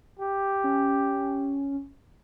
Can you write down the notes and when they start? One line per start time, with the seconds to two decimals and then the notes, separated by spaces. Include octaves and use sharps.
0.19 G4
0.64 C#4